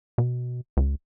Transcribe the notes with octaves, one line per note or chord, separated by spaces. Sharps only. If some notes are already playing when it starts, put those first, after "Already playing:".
B2
C#2